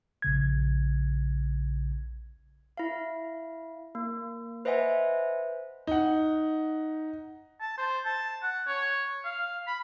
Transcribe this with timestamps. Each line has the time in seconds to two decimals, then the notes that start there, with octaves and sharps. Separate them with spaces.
0.22 A#1 C#3 G#6
2.77 E4 F5
3.95 A#3
4.65 B4 C5 D#5 E5 F#5 G#5
5.87 D#4 F#5
7.61 A5
7.78 C5
8.05 A5
8.43 F#5
8.67 C#5
9.25 F5
9.67 B5